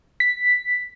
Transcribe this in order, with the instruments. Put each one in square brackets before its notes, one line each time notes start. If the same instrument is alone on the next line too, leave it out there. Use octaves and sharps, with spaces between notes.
[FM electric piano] B6